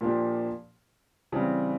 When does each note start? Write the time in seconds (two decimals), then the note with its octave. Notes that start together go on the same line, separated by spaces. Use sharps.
0.01 A#2 F3 A#3 D4 G4
1.32 C#3 E3 G3 C4